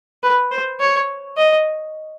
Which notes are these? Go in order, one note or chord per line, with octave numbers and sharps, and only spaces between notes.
B4
C5
C#5
D#5